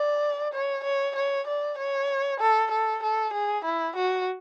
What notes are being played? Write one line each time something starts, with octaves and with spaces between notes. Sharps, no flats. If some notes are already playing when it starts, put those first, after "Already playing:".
Already playing: D5
C#5
C#5
C#5
D5
C#5
A4
A4
A4
G#4
E4
F#4